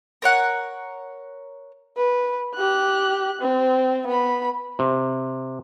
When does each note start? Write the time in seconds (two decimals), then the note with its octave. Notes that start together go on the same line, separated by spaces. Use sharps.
0.22 A#4 C#5 F#5
1.97 B4
2.55 G4 F#6
3.41 C4
4.07 B3 B5
4.79 C3